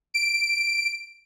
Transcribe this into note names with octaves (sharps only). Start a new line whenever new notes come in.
D7